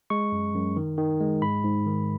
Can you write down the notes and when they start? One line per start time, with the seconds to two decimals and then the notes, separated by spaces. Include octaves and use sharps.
0.10 G#3 C#6
0.32 F#2
0.55 F#2
0.76 D#3
0.98 D#3
1.21 G#3
1.42 G#2 B5
1.64 G#2
1.87 D#3